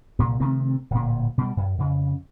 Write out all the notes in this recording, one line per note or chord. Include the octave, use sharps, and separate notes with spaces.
C2 A#2
C3 D#3 A3 C4
D1 A#2
B2 G3
F#2
F2 C#3